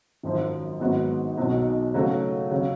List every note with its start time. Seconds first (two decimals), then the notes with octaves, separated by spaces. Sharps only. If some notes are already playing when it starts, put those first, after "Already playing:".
0.23 G#1 F#2 F3
0.80 G#1 G#2 F#3 B3 F#4
1.38 B1 B2 F#3
1.94 C#3 F#3 A3 C#4 F#4
2.51 C#3 F#3